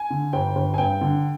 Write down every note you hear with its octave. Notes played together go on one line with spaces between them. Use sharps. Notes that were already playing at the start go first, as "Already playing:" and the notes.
Already playing: G#5
D3
G1 G5
G1
G#5
G2 G5
D3